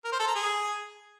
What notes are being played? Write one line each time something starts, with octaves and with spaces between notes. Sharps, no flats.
A#4
C5
A4
A#5
G#4